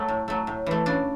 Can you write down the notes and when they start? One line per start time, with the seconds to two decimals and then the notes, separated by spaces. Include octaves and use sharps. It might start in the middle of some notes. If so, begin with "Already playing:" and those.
Already playing: F#3 A3
0.08 A2
0.28 F#3 A3
0.47 A2
0.66 E3 A3
0.86 C#3 D4